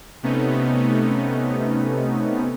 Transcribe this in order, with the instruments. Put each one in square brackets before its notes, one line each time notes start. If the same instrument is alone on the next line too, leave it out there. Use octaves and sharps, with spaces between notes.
[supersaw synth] C3 A3 B3 C#4 D#4